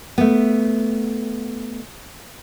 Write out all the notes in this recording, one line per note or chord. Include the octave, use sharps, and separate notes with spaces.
A3 B3